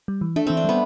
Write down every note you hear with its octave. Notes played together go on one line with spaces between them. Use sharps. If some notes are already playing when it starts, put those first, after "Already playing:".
G3
E3
A3 D4
E3 C4
D4
G3 B3